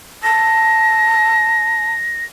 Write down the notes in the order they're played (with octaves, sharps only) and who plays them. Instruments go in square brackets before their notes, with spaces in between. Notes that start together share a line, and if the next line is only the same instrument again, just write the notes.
[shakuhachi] A5 [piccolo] A#6